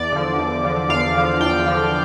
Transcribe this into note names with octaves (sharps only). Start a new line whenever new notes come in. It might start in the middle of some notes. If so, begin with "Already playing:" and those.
Already playing: E2 D5
D3 F3
E2
D3 F3
E2 F5
D3 F3
E2 G5
D3 F3